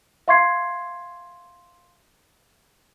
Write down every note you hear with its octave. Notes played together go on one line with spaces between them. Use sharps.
E5 F5 C6 C#6 G#6 C7